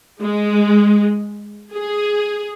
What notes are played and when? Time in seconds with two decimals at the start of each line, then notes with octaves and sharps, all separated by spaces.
0.22 G#3
1.73 G#4